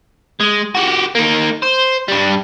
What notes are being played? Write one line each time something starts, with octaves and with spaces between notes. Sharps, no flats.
G#3
F#4 G4
A#3 D#4
C5
G2 G3